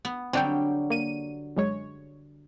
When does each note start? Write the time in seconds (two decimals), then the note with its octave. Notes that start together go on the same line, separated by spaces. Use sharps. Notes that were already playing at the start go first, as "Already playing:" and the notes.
0.05 B3
0.33 D3 F#3 G3 C4 D4 G5
0.90 A#3 D#7
1.56 F#2 G#3 C#5